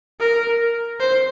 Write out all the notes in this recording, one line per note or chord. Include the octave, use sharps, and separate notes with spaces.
A#4
C5